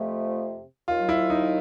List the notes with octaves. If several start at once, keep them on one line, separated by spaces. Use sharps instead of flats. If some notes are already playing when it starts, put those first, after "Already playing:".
Already playing: F2 C3 F3 A3
D#2 D#3 F#3 F4
E4
D#4